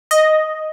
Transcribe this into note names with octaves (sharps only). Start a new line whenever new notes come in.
D#5